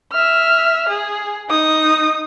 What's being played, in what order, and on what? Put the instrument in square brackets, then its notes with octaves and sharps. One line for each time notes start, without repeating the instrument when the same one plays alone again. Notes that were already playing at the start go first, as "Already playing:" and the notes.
[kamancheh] E5 F6
G#4
D#4 D#6